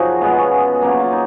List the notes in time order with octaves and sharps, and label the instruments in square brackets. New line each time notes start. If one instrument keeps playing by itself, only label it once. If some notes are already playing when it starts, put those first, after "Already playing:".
Already playing: [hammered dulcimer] F#2 C#3 F3 D#4 F#4 G#4
B2 G#3 B3 F4
C#4
C#3 F#3 A#3
F4
D#4